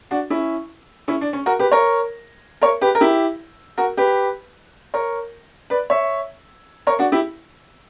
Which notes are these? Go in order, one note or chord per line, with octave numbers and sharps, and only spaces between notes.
D4 F#4
C#4 E4
C#4 E4
D4
C#4
F#4 A#4
G4 B4
A#4 C#5
A#4 C#5
G4 B4
A#4
E4 G4
F#4 A#4
G4 B4
A#4 C#5
B4 D5
C#5 E5
A#4 C#5
D4 F#4
E4 G4